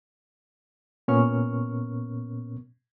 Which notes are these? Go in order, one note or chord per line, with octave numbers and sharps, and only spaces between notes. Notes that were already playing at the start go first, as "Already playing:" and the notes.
A#2 B3 C#4 A#4 C#6 F6